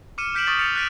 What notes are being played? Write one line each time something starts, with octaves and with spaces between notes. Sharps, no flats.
D6 F6 C#7 D#7 E7
F6 G6 B6 D7 E7 F#7
C#6 D#6 A6 B6 D7 F#7
F6 A6 B6 C#7 F7
F#6 A6 B6 D7 D#7